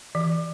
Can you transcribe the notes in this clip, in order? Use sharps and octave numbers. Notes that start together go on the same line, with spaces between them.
E3